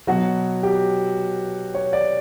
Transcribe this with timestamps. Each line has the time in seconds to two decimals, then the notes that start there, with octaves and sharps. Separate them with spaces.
0.07 B2 F#3 F#4
0.63 G4
1.75 C#5
1.93 D5